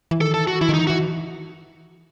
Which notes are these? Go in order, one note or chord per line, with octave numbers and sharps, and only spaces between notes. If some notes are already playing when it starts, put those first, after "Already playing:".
E3
D#3 A4
A4
F#4
E3 E4
D#3
E3 D#4
E3 F#4